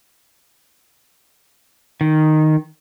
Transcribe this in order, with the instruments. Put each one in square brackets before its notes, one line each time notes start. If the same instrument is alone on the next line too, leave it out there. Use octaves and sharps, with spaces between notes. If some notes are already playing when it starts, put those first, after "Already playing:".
[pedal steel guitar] D#3